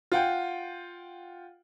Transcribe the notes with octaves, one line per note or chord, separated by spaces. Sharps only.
F4 F#5 G5